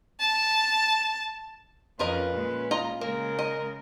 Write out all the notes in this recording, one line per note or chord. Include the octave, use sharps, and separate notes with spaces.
A5
F2 C#4 F4 A#4 B4 D#5
A#2 G#3 C#4
F4 D#5 A#5
C#3 G#3 A#3 A#4
D#5